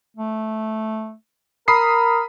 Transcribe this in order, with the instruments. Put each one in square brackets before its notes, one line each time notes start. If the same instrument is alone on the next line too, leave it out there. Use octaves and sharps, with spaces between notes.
[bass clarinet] A3
[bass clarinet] A#4 [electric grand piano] B5 D#6 C7